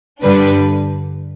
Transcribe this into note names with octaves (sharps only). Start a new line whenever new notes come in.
G2 D3 G3 D4 B4